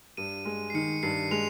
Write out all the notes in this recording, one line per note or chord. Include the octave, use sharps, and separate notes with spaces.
G2 D#7
G#3
C7
D#3 C#7
G2 C7
G#3 F7